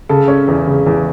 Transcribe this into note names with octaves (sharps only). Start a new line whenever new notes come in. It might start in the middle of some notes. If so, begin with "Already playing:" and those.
C#3 A4
C#4
E2
C#3
E2